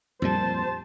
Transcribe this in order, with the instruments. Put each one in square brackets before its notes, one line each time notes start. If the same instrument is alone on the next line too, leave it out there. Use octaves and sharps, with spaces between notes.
[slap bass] F2 A#2 G3 [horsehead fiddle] C5 A5